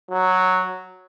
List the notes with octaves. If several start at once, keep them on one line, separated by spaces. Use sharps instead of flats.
F#3